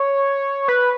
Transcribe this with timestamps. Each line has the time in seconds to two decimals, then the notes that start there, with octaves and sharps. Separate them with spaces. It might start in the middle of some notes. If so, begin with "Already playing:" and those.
Already playing: C#5
0.68 B4